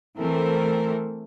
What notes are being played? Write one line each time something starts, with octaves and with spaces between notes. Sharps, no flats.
E3 A3 C4 A4 A#4